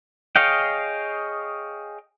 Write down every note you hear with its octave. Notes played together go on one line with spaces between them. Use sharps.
G#4 C#5 D#5 F5 G5